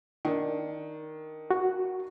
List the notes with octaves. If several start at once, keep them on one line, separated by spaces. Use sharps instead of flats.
D#3 D4
F#4